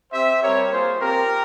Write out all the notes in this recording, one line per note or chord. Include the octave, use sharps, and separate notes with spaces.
C4 G4 C5 E5
G3 C4 G4 A#4 C#5
A#3 F4 G#4 C5
C4 F4 G4 A#4